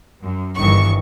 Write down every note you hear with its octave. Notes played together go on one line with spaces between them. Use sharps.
F#2
G1 G2 D#3 E3 C#6